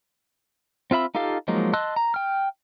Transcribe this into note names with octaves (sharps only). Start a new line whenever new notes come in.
C4 F4 E5 B5 E6
D#4 F4 G4 A4 F5
F3 F#3 G#3 A#3 D#4
D#5 A5 C6 E6 F#6
A#5
G5 F6